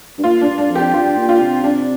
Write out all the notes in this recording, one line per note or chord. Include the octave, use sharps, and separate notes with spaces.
G2
A#2 F4
D4
G2
D4
F2
G4
G2 F4
A#2
F4
C3
C3 D4